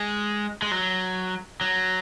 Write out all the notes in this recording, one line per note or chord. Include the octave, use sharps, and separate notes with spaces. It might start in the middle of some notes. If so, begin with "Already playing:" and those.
Already playing: G#3
G#3
F#3
F#3